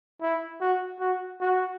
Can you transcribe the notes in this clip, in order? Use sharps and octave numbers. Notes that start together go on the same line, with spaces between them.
E4
F#4
F#4
F#4